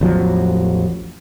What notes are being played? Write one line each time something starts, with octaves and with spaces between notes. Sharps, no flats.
A1 E2 F3 F#3